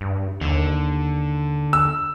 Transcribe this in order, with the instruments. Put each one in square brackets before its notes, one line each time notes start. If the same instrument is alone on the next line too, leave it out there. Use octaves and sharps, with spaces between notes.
[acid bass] G2
[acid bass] D#2 [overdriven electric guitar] D3
[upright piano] E6